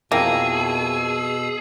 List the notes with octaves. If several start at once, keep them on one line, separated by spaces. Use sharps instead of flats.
F2 B2 A#3 E4 G#4 G5 E6